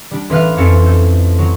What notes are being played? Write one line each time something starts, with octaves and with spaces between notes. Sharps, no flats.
G3 D4
A1 E3 B4 F5 F6 F#6
F2 C#4 A4 A6 C#7
A4 G6
F#3